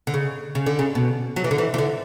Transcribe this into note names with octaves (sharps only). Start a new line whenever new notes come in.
D3
C#3
C#3
D3
C#3
B2
F#3
E3
D3
E3
E3
D3